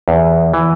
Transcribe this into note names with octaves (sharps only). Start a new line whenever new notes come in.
E2
E3